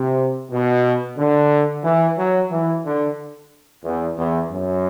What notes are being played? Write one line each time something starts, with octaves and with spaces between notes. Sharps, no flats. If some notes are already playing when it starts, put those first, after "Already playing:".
Already playing: C3
B2
D3
E3
F#3
E3
D3
E2
E2
F#2